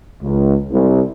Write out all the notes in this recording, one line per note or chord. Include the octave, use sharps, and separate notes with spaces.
C#2
C2